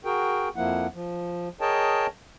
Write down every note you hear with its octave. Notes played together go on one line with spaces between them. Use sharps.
F#4 G#4 A#4 G5
F2 F3 A#3 E4 F#5
F3
G#4 A#4 C#5 D#5 G5 A5